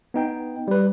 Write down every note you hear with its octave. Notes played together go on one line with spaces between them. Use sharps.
B3 D#4 G5
G3 B4